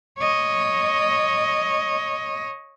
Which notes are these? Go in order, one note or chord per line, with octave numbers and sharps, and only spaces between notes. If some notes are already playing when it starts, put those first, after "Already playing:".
C#5 D#5